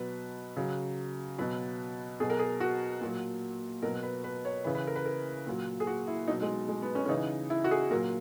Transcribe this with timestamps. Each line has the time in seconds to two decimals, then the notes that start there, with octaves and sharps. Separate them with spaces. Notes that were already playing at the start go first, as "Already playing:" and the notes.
Already playing: B2 F#3 B4
0.57 C#3 F#3
1.38 B2 F#3 B4
2.20 B2 F#3 G#4
2.30 A#4
2.39 G#4
2.60 F#4
3.01 A#2 F#3
3.82 B2 F#3 A#4
4.03 B4
4.24 B4
4.45 C#5
4.64 C#3 E3 B4
4.75 B4
4.87 A#4
4.96 B4
5.05 A#4
5.47 A#2 F#3
5.80 G#4
5.87 F#4
6.07 E4
6.28 B2 F#3 D#4
6.42 G#3
6.69 G#3
6.82 B3
6.95 C#4
7.05 C#4
7.09 C#3 E3 D#4
7.50 E4
7.64 F#4
7.71 G#4
7.91 A#2 F#3 A#4